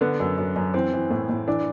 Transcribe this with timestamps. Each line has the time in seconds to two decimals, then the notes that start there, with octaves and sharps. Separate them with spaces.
0.01 D3 B3
0.20 F#2
0.38 F#2
0.56 F#2
0.74 E3 C4
0.93 E3
1.11 A2
1.29 A2
1.47 E3 D4